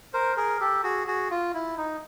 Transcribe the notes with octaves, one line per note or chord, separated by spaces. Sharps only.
A#4 C5
G#4 A#4
G4 A4
F#4 G#4
F#4 G#4
F4
E4
D#4